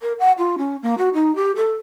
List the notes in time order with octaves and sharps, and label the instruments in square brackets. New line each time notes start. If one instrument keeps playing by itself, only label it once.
[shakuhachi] A#4
F#5
F4
C#4
A#3
F#4
D#4
G4
A4